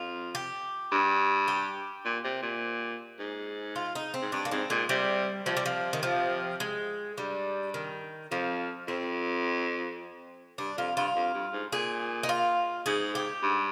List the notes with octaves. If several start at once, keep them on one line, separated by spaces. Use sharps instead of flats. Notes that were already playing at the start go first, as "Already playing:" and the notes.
Already playing: F2 F4
G4
G2
G4
A#2
C3
A#2
G#2
F4
D#4
C4
G#2
G2 D4
A#3
G#2 C4
A#2 G#3
C3 G3
C3 F3
G3
F3
D#3
F3
G#3
G2 G3
D#3
F2 F3
F2 C4
G2 D4
F2 F4
G2 F4
F2
G2
G#2
A#2 G#4
D#4
F4
G#2 G#4
G4
G2